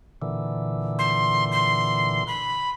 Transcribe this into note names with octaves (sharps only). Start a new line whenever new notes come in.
A#2 D3 E3
C6
C6
B5